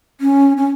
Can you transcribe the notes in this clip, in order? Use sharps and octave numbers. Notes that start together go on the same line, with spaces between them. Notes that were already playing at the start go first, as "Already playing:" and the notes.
C#4
C#4